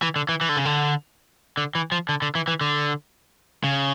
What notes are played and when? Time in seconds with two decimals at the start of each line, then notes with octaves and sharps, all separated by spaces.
0.02 E3
0.16 D3
0.29 E3
0.41 E3
0.49 D3
0.57 C#3
0.65 D3
1.57 D3
1.75 E3
1.92 F3
2.09 D3
2.22 D3
2.35 E3
2.48 E3
2.61 D3
3.64 C#3